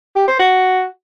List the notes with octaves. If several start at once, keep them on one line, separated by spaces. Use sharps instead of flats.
G4
C5
F#4